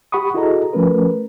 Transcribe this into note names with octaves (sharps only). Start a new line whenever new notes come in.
G4 F#5 B5 C#6 D#6
E4 F#4 G#4 A4 D#5 A#5
F3 A3 C#4 A#4 B4